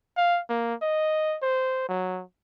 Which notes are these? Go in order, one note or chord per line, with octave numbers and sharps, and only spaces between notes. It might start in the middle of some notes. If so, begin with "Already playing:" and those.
F5
A#3
D#5
C5
F#3